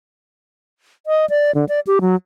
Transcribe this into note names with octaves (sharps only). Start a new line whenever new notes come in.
D#5
D5
D3
D5
G4
F#3